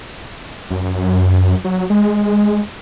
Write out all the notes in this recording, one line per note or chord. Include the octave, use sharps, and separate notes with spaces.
F#2
F#2
F#3
G#3